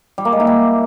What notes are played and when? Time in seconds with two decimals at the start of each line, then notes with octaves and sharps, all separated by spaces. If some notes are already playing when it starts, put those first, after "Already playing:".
0.18 G3
0.25 A#3
0.32 G#3
0.40 E4
0.47 G3